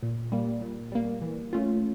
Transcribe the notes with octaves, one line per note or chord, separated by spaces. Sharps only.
A#2
G3 A#3
A#2
G3 A#3
E3
A3 C#4 F4